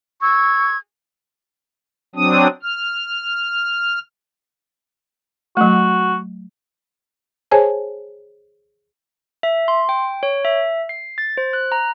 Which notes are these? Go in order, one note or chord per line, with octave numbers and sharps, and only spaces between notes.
C#6 E6 G#6
F#3 C4 D4 D#6
F6
F#3 A3 F#4
G#4 C5 C#5 G#5 A5
E5
C6
G5
C#5
E5
C7
A6
C5
F#6
A#5